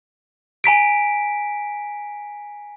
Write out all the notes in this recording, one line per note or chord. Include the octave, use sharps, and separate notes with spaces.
G#5 A#5 B6 D7